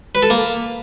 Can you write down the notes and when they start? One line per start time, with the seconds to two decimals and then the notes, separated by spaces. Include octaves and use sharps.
0.15 B4
0.22 A4
0.30 A#3